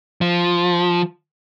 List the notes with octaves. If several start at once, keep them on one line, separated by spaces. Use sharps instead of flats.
F3